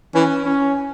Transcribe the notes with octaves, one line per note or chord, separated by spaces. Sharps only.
E3 C#4
C#4